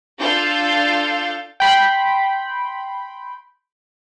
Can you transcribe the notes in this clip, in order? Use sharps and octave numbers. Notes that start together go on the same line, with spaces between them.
D4 F4 A4 F5 G6 A6
G5 B5 C6